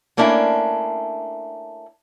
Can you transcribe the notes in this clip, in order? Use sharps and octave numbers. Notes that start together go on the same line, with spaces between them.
A3 A#3 C#4 D4 E4